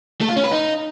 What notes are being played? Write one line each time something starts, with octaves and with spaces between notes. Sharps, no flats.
A3
F4
C#4
B4
D#4